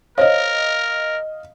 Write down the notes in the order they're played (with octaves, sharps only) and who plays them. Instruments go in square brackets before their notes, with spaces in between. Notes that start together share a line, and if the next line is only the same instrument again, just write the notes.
[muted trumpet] A#4 [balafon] C5 C#5 [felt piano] D#5 F5